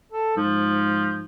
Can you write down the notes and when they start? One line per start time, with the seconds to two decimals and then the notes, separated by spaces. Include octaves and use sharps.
0.12 A4
0.37 G#2 F3